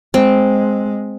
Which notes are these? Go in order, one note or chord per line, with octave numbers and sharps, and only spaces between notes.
G#3 C4